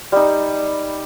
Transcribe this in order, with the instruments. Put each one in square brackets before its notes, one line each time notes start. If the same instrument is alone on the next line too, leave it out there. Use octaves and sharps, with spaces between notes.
[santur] G3 D#4